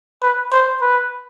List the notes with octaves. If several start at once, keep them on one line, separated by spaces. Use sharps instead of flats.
B4
C5
B4